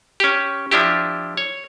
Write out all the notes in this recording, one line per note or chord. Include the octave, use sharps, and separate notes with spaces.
C#4 G4
F3 D4 E4 G4
C#5